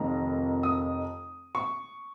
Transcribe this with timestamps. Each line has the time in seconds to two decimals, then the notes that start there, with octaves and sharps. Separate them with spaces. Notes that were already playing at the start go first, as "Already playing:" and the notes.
Already playing: F1 F2 D#3 A#5
0.63 D#6
1.55 C#6